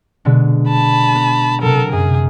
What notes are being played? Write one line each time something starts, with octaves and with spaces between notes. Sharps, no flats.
B2 D3 G#3
A5 B5
B3 B4
C3 F#3 A4 A#4
F#2 G#4